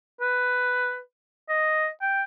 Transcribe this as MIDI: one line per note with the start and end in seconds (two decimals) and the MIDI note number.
0.21 0.98 71
1.49 1.88 75
2.01 2.22 79